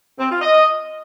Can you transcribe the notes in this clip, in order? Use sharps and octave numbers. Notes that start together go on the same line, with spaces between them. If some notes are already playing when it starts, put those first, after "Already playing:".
C4
F4
D#5